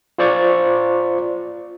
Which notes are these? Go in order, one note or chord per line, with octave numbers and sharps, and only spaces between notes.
F4 C5 D5 C#6